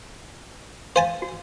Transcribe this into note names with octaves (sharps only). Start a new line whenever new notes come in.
C5 F5 G#5 A5
F#4